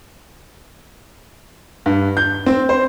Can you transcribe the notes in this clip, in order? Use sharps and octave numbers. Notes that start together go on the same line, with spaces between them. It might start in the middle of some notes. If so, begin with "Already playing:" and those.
G2
G6
C4
C5